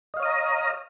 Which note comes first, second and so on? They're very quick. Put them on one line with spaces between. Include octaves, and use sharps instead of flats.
D#5 F5 C#5 D#6 A#5